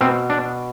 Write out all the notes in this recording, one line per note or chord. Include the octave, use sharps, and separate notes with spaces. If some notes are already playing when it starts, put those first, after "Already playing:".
B2 C4
D4